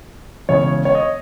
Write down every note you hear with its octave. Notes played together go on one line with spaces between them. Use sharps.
E1 E2 C#3 C#5
C#5
D#5